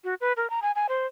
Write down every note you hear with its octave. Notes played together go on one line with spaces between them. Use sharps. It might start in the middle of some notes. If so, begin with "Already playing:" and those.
F#4
B4
A#4
A#5
G#5
G#5
C5